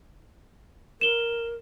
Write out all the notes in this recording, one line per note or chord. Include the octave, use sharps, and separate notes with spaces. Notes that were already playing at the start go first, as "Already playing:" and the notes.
A#4 E7 G7